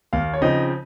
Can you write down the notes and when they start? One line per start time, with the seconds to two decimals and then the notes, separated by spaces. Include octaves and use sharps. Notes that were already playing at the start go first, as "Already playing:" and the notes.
0.13 D#2 F5
0.34 C#5
0.42 C#3 F3 C4 D#4 D#5